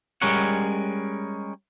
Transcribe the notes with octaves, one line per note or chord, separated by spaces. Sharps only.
G3 G#3 C#4 A#4 C#5 F#5